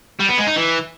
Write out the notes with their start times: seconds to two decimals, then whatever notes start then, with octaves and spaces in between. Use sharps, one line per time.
0.20 G3
0.29 B3
0.39 G#3
0.48 D#4
0.57 E3